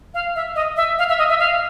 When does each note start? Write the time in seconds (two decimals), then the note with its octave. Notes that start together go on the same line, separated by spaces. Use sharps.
0.14 F5
0.36 E5
0.55 D#5
0.76 E5
0.99 F5
1.09 E5
1.19 D#5
1.29 E5
1.39 F5